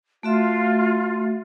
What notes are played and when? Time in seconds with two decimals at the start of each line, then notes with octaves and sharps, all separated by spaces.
0.23 A3 F4 F#4 E5